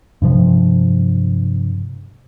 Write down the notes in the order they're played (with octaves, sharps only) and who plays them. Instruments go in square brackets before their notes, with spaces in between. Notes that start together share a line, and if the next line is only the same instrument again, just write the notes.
[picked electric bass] G2 C3 F3